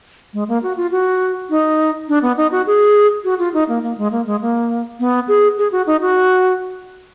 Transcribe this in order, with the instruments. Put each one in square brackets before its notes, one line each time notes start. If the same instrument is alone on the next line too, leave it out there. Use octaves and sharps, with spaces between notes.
[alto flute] G#3
A#3
F#4
F4
F#4
D#4
D4
B3
D#4
F#4
G#4
F#4
F4
D#4
A#3
A#3
G#3
A#3
G#3
A#3
B3
G#4
G#4
F#4
D#4
F#4